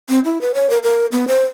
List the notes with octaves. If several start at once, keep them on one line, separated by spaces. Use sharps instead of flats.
C4
E4
B4
C#5
A#4
A#4
B3
C5